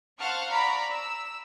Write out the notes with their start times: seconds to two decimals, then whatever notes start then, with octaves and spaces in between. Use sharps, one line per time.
0.20 C5 F5 F#5 A5 C#6 F6
0.51 D5 A#5 B5 C#6 B6
0.90 E6